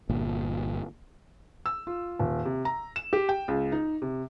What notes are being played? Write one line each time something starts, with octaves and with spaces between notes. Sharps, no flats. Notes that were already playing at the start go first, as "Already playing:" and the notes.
G1 A#2
E6
F4
D#1
C3
A#5
E7
G4
G5
C#2
D#4
C3